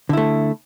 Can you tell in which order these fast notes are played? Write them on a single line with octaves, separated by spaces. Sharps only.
D3 E4 A3